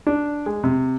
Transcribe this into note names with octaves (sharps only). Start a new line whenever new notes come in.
D4
G#3
C3